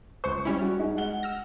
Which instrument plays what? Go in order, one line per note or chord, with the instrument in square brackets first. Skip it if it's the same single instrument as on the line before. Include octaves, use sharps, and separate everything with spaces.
[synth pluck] C#2 C5 [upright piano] C#6
[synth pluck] G3 C#4 E4
[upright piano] F#4
G#3 D#4 G#4
F#5 G7
[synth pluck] E6 F6 A#6